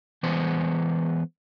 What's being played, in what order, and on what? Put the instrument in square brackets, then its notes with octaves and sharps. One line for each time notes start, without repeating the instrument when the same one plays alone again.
[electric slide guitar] E3 G#3 B3 C5